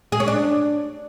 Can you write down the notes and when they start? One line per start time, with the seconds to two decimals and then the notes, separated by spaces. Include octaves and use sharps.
0.12 G#4
0.20 C#4
0.28 D4